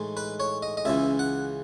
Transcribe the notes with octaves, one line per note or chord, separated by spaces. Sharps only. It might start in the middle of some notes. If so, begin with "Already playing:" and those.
Already playing: A2 E3 G#3 D#4
B4
C#5
D#5
D#5
C#2 C#3 E3 E5
F#5